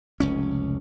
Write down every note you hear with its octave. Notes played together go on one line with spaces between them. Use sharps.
F1 C#2 C#4